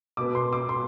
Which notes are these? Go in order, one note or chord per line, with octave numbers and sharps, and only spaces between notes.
B2 B3 D6
C6
D6
C6